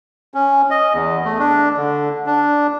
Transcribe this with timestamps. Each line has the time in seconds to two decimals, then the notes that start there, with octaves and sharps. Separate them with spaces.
0.34 C#4
0.70 D#5
0.93 E2
1.25 A3
1.39 D4
1.77 D3
2.26 D4